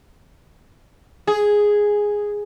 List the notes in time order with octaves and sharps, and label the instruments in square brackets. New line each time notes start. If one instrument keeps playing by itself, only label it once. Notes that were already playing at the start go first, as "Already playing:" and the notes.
[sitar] G#4